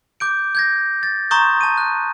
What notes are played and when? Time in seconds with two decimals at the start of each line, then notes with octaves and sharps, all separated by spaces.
0.20 D6 G6 D7
0.55 G6 G#6 A#6
1.03 A6
1.31 A#5 C6 C#6 D#6 G6
1.61 A5 D#7
1.78 F#6